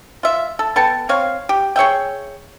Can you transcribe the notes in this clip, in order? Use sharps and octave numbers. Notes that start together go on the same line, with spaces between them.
F4 E5
A4
B3 A4 G5 A5
C4 C#5 F5
G4
G#4 C#5 E5 G5